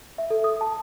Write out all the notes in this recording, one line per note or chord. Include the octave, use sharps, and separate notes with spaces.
E5
A4
D#6
A5